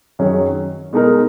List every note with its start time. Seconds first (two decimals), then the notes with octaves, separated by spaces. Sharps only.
0.19 F#2 D#3 F#3 C#4 G#4
0.93 B2 G#3 D#4 A#4